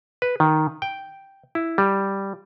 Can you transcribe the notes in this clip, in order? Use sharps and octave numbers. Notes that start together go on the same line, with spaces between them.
B4
D#3
G5
E4
G3